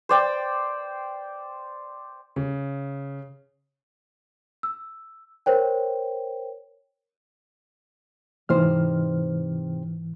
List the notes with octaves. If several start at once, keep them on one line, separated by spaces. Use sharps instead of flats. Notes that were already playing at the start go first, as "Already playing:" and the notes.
C5 D5 G5
C#3
E6
A#4 C5 C#5 G5
G#2 C3 E3 D#4 C5 F6